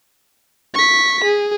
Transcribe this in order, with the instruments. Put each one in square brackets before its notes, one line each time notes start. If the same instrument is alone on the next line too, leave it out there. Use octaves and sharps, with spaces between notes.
[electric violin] C#6 B6
G#4